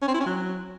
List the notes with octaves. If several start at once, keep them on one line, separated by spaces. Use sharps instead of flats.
C#4
C4
E4
C#4
F#3